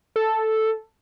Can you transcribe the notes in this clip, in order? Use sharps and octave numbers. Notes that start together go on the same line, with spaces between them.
A4